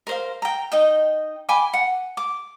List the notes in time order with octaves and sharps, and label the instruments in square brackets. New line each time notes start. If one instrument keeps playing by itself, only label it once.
[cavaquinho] A#4 C5 F5
G5 A#5
D#4 D#5 G5
G5 G#5 B5 D6
F#5
D6